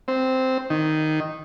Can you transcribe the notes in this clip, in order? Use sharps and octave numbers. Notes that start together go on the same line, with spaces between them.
C4
D#3